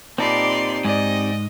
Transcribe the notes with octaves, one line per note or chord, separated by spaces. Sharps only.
A#2 C4 D#4 G4 D5 A5 B5 C6
G#2 D5 D#5 G#5